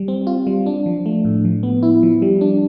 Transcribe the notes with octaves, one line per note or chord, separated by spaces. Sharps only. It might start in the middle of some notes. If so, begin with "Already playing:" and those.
Already playing: G3
C4
F4
G3
D4
F3
A3
A2
F3
B3
E4
F3
G3
D4